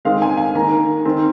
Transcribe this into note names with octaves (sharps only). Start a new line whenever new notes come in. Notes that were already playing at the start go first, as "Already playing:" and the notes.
D#3 G#3 C4 F5
G#5
G#5
D#3 A#3 A#5
D#3 C4